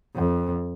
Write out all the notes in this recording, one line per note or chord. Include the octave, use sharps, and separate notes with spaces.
F2